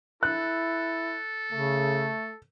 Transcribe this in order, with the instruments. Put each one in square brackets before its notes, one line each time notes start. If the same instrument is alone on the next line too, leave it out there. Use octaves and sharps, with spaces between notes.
[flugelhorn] E4 [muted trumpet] A4 [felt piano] F#6
[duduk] C#3 [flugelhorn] A3